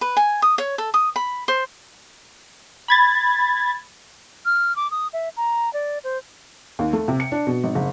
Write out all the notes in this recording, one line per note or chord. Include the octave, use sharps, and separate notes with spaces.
B4
G#5
D#6
C#5
A4
D#6
B5
C5
B5 G#6 A6
F6
D6
D#6
E5
A#5
D5
C5
D#2
A3
C3
C#7
D4
B2
G#1
F#1